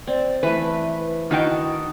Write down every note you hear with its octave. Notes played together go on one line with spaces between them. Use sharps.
C4 D5
E3 A3 B4 E5
D#3 D#4 E4 F#4 G5 A5